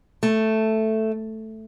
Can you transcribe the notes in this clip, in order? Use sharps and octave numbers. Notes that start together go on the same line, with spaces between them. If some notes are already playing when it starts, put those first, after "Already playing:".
A3